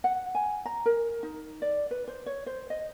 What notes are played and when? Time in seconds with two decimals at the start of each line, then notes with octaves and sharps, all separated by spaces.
0.04 F#5
0.35 G#5
0.66 A#5
0.86 A#4
1.23 D#4
1.62 D5
1.91 B4
2.08 C5
2.26 C#5
2.46 C5
2.70 D#5